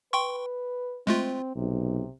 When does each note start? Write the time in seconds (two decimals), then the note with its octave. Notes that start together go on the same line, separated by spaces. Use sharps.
0.13 B4 G5 C6 C#6
1.07 G#3 A3 C4 F4
1.56 B1 C3